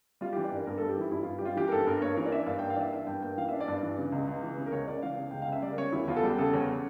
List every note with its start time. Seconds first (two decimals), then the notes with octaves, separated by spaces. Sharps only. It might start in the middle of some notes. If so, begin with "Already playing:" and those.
0.21 G3 F4
0.33 E3 G4
0.44 D5
0.52 G2 A#4
0.66 G2 A#4
0.78 G3 A4
0.89 G4
0.97 E3 E4
1.11 G2 E4
1.23 G2 F4
1.39 G4
1.41 G3 F4
1.57 E3 G4
1.68 A#4
1.72 G2 A4
1.87 G2 A#4
2.02 A#3 C#5
2.17 E3 A#4
2.26 D5
2.32 D4 E5
2.46 G2 F5
2.59 A#3 G5
2.70 F5
2.76 E3 D5 E5
2.93 D4 E5
3.07 G2 G5
3.22 A#3 G5
3.37 E3 F5
3.49 D4 E5
3.60 D5
3.68 G2
3.83 E3
3.98 C#3
4.12 C#2
4.28 C#2
4.43 E3
4.57 C#3
4.66 A#4
4.72 C#2 C#5
4.87 C#2 D5
5.02 E3 F5
5.18 C#3
5.31 C#2 G5
5.42 F5
5.47 C#2
5.52 E5
5.62 G3 D5
5.72 A#4
5.78 C#3 C#5
5.92 E2 E4
6.08 E2 F4
6.16 A4
6.23 G3 G4
6.38 C#3 A4
6.53 E2 C#5